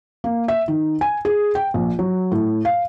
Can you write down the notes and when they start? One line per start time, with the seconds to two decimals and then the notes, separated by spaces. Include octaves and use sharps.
0.24 A#3
0.48 E5
0.68 D#3
1.01 G#5
1.25 G#4
1.55 G5
1.74 A#1
1.99 F#3
2.32 A2
2.65 F5